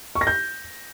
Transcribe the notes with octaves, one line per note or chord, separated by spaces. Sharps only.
C#6
A#6
G6